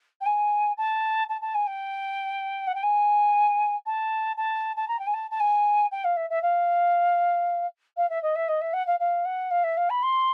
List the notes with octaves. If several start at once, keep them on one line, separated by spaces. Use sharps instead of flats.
G5
G#5
A5
A5
A5
G#5
G5
F#5
G5
G#5
A5
A5
A5
A#5
G5
G#5
A5
A5
G#5
G5
F5
E5
E5
F5
F5
E5
D#5
E5
D#5
E5
F#5
F5
F5
F#5
F5
E5
F5
B5
C6